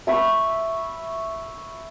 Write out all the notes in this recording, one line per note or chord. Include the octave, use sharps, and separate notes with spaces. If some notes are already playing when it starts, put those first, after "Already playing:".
E5 B5 C#6